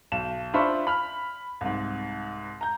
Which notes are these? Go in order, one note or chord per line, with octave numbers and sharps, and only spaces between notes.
B1 E7
D4 F4 C5 E5 B5 C#6
B5 F6
C2 G#2
A#5 G6